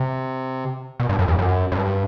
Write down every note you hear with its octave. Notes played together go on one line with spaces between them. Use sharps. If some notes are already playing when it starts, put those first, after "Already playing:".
Already playing: C3
B2
G2
F#2
E2
F#2
F#2
G2